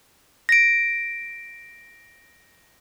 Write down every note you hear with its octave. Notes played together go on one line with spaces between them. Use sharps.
A#6 D7